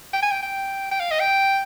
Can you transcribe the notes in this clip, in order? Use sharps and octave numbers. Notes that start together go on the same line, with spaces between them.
G5
G#5
G5
G5
G5
F5
D#5
G5